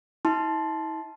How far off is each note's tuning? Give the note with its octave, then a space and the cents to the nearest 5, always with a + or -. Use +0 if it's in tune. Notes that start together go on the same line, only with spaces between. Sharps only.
E4 -40 A5 -15 C6 +0